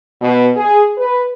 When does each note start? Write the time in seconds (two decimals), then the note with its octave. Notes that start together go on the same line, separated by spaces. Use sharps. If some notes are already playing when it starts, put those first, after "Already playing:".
0.22 B2
0.57 G#4
0.97 B4